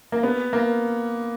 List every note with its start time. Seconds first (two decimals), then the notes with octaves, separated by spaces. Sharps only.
0.12 A#3
0.23 B3
0.53 A#3